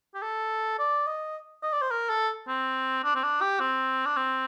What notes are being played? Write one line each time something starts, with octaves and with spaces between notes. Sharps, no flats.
G4
A4
D5
D#5
D#5
D5
C5
A#4
A4
C4
D4
C4
D4
G4
C4
D4
C4